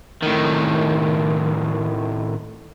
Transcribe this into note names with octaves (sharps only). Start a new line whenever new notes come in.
A2 D#3